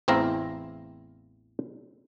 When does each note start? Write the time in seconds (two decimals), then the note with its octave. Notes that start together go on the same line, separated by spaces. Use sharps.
0.08 A1 E2 C4 E4 F5 A#5